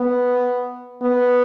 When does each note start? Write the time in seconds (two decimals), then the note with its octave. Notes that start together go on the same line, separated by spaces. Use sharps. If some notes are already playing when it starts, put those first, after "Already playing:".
Already playing: B3
1.02 B3